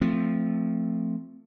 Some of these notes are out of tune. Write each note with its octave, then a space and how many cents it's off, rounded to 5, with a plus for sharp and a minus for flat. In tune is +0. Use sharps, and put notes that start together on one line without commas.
F3 +0 A3 +15 C4 +0